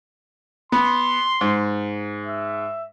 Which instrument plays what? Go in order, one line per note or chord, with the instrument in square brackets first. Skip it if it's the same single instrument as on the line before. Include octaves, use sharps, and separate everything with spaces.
[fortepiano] B3 [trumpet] C6
[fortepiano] G#2
[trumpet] E5